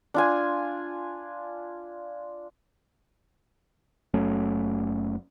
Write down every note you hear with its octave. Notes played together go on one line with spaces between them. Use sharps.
D4 F4 G#5
F#1 F#3 A3 C#4